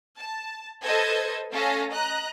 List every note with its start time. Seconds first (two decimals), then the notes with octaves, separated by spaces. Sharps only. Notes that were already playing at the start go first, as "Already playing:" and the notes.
0.18 A5
0.84 A4 B4 C5 D#5 G#6
1.51 A3 C#4 A4 F5 A#6
1.92 D#5 A#5 F#6